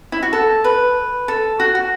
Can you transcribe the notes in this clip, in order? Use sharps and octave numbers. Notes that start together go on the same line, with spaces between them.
E4
F#4
A4
B4
A4
F#4
F#4